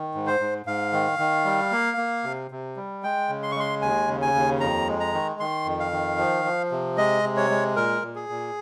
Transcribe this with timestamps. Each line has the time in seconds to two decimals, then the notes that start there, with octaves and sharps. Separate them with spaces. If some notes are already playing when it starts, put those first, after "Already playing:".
Already playing: D#3
0.15 G#2
0.27 C5
0.40 G#2
0.66 G#2 F5
0.93 D#3
1.19 D#3
1.45 G3
1.72 A#3
1.97 A#3
2.24 C3
2.51 C3
2.76 G3
3.03 G#3 G5
3.29 C#3
3.43 C6
3.51 C#6
3.56 G#3 C6
3.82 D#2 G#5
4.08 C#3
4.22 G#5
4.35 D#2
4.60 F2 A#5
4.87 G#3
5.00 A#5
5.13 D#3
5.40 D#3 C6
5.65 F2
5.80 F5
5.92 D#3
6.18 F3
6.45 F3
6.71 C3
6.97 G#3 D#5
7.23 C3
7.37 C#5
7.50 G#3
7.76 A#2 A#4
8.02 A#2
8.16 G#4
8.29 A#2